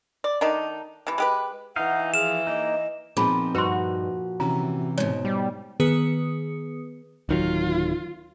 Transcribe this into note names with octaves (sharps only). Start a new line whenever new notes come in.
D5
D#3 A3 D4 D#4
C3 E3
G#3 G4 B4
E3 D#4 F5 F#5
F3 G#4 F5 E7
A#3 D#4 D#5
A#2 F3 B3 C4 D#4 G#4 B5
G2 D#4 F#4 B4 C6
C3 E3 C#4 A#5
G#2 B2 C#5
G3
D#3 B3 G#4 B4 D#6 C#7
D1 D#3 F#3 F4